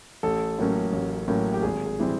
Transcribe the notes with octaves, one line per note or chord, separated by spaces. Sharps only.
A1 A4
A2 F#3 A#3 C#4
A1
A2 F#3 A#3 C#4
G4
G#1 G#4
G#4
E3 G3 C4